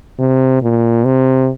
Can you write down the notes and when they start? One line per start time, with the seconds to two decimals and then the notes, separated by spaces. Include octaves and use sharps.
0.19 C3
0.62 A#2
1.04 C3